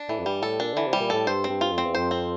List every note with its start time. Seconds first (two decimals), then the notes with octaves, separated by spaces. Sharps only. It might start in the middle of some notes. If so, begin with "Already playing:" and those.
Already playing: D4
0.09 A2 E3
0.19 F2
0.26 G2 G3
0.42 A2 A4
0.60 A#2 D4
0.74 D3 E3
0.87 C3
0.93 G3
1.00 A#2
1.10 A2 A4
1.27 G2 C5
1.44 C4
1.50 G2
1.61 F4
1.72 F2
1.78 C4
1.85 E2
1.95 F2 C5
2.11 C4